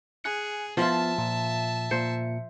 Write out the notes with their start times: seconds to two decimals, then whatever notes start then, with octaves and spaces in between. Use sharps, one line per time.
0.24 G#4 G#5 F#6 C#7
0.77 F3 B3 F4 E5 A5 C6
1.18 A#2
1.91 A#2 C5 C#7